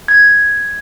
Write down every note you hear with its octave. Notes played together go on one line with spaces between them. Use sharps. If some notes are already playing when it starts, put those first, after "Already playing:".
G#6